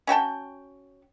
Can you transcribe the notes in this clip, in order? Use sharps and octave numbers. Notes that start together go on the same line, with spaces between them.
C#4 F#4 G5 A5